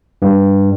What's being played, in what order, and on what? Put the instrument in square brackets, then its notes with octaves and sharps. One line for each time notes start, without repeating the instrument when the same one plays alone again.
[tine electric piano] G2